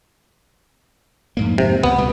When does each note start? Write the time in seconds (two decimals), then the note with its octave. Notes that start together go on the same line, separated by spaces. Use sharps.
1.37 F2 G#2 A#3
1.58 C3
1.83 C#2 B3
1.98 C#2 B2 G3